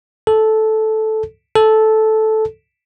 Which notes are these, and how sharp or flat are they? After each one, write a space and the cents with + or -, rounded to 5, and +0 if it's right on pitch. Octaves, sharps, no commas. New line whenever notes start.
A4 -10
A4 -10